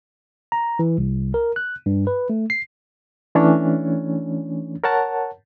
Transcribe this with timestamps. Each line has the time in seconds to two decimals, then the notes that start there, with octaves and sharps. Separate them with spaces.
0.52 A#5
0.79 E3
0.98 C2
1.34 A#4
1.56 F#6
1.86 G2
2.07 B4
2.30 A3
2.50 C7
3.35 E3 A3 C#4 D4 C#5
4.84 A#4 C#5 F#5 A5